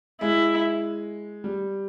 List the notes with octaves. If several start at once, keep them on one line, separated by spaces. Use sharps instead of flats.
G#3 E4
G3